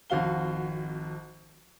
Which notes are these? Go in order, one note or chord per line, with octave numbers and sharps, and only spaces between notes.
G#1 F2 F#4 F5 G7